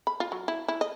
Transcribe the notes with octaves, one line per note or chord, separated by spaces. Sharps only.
B5
F4
F#3
E4
E4
D#5